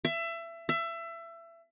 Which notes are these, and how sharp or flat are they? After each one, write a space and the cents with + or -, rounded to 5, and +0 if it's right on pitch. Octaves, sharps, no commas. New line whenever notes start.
E5 +25
E5 +25